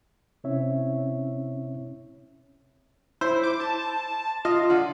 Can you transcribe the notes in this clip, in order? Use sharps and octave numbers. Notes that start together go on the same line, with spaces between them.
C3 C4 C#4 E4 C#5 E5
E4 C5
D6
A5
F4 D#5
D3